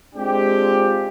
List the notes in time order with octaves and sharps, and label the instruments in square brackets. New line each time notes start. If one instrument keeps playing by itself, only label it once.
[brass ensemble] G#3 C4 D4 F4 G4